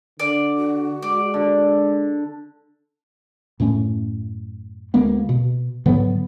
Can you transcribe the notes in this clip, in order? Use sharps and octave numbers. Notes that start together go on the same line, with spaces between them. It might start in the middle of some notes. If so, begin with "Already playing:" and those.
D3 D5
F#4
G#3 D5
D3
F#2 A2 A3 C#4
D2 G#3 A#3 B3
B2
G#2 D3 F#3 B3